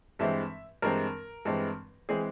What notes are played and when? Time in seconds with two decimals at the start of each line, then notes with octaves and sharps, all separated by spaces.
0.19 G2 E3 G#3 C4 E5
0.82 G2 E3 G#3 C4 A#4
1.45 G2 E3 G#3 C4
2.09 E3 G#3 C4 G#4